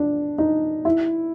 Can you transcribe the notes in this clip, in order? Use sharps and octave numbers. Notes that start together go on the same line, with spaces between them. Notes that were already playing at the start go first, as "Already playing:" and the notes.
Already playing: D4
D#4
E4